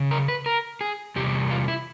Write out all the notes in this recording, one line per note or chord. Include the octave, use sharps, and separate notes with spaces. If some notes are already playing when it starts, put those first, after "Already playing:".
Already playing: C#3
A#4
B4
A#4
G#4
E2 C3 G3 G4
F4
E4